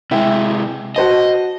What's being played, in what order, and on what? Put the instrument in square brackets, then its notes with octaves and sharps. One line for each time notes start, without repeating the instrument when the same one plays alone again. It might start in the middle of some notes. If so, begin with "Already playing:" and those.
[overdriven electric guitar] C3 G#3 [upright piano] E4 E5 G5
[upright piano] F#4 C5 A5 [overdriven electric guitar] D#5